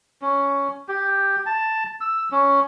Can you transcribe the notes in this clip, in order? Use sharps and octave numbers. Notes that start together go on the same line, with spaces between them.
C#4
G4
A5
E6
C#4